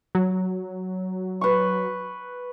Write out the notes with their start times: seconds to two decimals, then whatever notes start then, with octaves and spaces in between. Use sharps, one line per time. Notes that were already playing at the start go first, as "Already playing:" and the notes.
0.15 F#3
1.41 B4 C#6